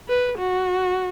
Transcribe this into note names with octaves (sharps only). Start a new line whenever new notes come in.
B4
F#4